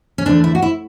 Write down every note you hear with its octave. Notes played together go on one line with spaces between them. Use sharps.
C#4
E2 D3 A3 D4
E4
F#4
E4